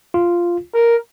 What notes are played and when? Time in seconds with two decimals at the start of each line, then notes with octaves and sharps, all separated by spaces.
0.14 F4
0.74 A#4